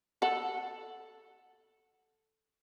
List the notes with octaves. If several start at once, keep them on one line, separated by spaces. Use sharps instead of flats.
A4 F#5